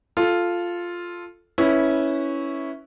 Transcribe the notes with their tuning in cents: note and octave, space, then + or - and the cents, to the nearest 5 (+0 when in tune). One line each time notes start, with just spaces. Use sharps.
F4 +0 A4 -5
C#4 +0 E4 -15 B4 +0